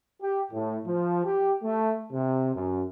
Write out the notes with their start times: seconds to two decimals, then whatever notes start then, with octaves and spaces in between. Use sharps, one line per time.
0.22 G4
0.52 A2
0.86 F3
1.24 G4
1.63 A3
2.13 C3
2.55 F#2